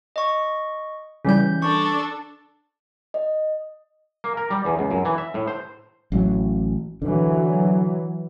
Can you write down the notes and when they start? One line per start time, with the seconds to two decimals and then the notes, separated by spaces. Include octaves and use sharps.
0.16 D#5 C#6
1.25 C#3 E3 G3 C#4 G6
1.62 D4 A4 C#6
3.14 D#5
4.24 A#3
4.37 A#4
4.50 G3
4.65 E2
4.79 C#2
4.90 F#2
5.05 E3
5.18 E5
5.34 A2
5.48 C5
6.12 A1 A2 F#3
7.02 D3 E3 F#3